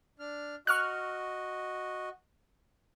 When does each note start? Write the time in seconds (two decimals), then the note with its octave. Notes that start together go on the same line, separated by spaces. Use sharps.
0.19 D4 F6
0.67 F#4 D#5 C#6 F6 F#6